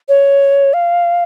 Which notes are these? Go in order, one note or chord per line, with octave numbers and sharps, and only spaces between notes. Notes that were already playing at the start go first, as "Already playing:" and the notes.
C#5
F5